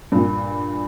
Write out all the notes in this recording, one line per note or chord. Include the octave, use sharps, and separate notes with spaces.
G2 A#2